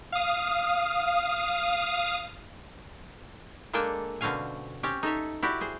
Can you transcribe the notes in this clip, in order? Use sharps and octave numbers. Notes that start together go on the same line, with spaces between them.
F5 D#6
G#3 A#3 D4 A4 G5 G#5
B2 D3 C4 C#4 F5 G#5
C4 C#4 G4
D#4 A4 C#5 E5
E4 F#4 G4 D5
G#4 C5